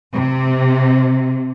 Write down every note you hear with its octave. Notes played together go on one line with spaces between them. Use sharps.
C3